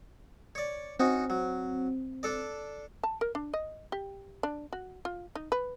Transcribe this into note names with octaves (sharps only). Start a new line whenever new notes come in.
C#5 D5
C4 C#4 D#4 F#4
F#3
D4 A4 D5
A5
A#4
D4
D#5
G4
D4
F#4
F4
D#4
B4